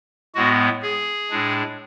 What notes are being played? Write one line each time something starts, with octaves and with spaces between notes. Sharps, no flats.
A2 G#3 B3 F#4
G#4
A2 G#3 D4